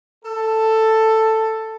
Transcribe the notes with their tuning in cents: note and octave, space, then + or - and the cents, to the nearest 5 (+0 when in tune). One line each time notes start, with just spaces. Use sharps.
A4 +10